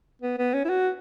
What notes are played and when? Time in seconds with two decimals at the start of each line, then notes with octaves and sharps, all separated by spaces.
0.22 B3
0.38 B3
0.54 C#4
0.65 E4
0.69 F#4